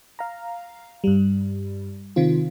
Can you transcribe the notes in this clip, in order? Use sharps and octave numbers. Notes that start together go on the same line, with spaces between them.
F5 A#5
G2 G3
C3 D#3 C4 F4